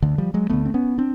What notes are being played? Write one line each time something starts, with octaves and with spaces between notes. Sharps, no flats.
D2 D3
F3 G3
F#3 G#3
D2 D3 A3 B3
C4
B3 C#4
C4 D4